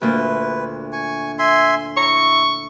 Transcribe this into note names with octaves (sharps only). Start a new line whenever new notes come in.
D2 A#2 B4
G#5 C#6
E5 G#5 C6
E4 A#5 C#6